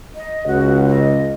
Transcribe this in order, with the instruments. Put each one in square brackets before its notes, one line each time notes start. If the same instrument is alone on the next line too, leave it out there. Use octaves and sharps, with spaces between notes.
[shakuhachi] D#5
[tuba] C#2 [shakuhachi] F#4
[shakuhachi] D#5